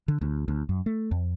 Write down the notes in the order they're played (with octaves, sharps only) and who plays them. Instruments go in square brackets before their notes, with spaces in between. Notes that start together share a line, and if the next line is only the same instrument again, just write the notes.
[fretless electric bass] D3
D2
D2
F#2
A3
F2